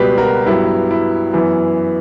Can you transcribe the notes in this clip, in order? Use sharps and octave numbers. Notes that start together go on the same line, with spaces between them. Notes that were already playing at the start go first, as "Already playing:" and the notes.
Already playing: C#2 B2 G3 G4 B4
F#4 A#4
G2 F#3 B3 E4 G4
E4
F#2 E3 B3 E4